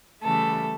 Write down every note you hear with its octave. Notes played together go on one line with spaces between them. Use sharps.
C#3 E3 G3 A3 A4